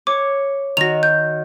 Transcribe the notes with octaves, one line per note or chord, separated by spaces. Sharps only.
C#5 D6
D#3 F#4 A#6 F7
G6